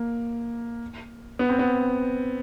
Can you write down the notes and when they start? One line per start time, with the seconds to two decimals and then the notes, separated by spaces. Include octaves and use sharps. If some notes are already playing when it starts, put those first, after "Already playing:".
Already playing: A#3
1.39 B3
1.49 C4
1.59 B3